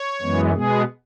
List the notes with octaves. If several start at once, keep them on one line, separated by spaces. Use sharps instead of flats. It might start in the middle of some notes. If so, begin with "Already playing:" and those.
Already playing: C#5
F#2 E3 G#3 B3
B2 G#3 B3 G#4